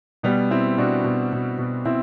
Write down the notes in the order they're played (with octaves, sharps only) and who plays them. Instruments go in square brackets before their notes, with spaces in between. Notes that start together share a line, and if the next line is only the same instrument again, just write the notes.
[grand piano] B2 G3 B3
B2 C4 E4
B2 D4 F#4
B2
B2
B2
B2 C4 E4